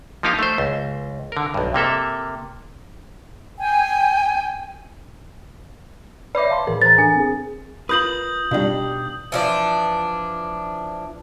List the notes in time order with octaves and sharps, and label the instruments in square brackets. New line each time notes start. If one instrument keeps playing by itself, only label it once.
[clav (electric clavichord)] F3 A#3 D#4 G4 F5
A3 C5
C#2
D3 A#4
B1 G2
C3 A#3 A4 E5
[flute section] G5 G#5
[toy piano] B4 C#5 E5 [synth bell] D5 B5 D6
[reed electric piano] F5 A5 C6
[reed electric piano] A2 E3 G#4 [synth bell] A#4
[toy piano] C5 A#5 [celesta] A6
[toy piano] D4 A4 G#5
[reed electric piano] C4 G#4
[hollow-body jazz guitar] F4 A#4 B4 [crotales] D#6 G6 F#7
[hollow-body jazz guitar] B2 D#4 [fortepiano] G3 D4 F4
[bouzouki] E3 F3 D4